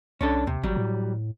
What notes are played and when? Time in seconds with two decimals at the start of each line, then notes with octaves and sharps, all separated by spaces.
0.21 C2 C#4 D4 A4
0.47 D#2 C3
0.63 G#1 F#3 G3
0.76 A2